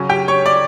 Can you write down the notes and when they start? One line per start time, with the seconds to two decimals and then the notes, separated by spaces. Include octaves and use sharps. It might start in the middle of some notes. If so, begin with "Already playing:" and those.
Already playing: C#3 F#3 C#4
0.09 G4 G5
0.28 C#5 C#6
0.46 D5 D6